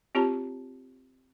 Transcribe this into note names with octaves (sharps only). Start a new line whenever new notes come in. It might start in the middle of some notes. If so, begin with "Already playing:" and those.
C4 F4 G4 C#5 A5 A#5